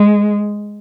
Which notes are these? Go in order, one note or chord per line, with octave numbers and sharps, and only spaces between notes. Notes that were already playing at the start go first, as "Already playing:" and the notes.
Already playing: G#3